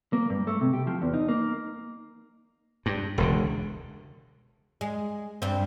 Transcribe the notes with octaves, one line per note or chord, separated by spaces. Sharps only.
A#3
G2
A3
C3
G4
F3
E2
D#4
A#3
G2
E1 C#2 D3
G#3
G2 C4